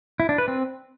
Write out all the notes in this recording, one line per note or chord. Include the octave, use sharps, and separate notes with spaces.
E4
D4
B4
C4